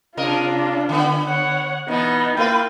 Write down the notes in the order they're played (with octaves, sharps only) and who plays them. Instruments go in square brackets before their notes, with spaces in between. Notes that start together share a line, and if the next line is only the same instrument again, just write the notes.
[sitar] C3 A#4 D#5 [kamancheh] D4 F4
[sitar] D3 B3
[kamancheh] C#5 F#5
[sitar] B2 E3 [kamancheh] B3 D#4
[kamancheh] A#3 G5 [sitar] E4 F4 B4